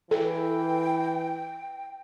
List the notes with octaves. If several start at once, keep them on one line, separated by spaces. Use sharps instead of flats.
E3 A4 G5